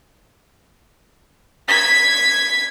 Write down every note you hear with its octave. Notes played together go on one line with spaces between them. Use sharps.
G#6 B6